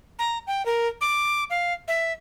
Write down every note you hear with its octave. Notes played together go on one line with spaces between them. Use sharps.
A#5
G5
A#4
D6
F5
E5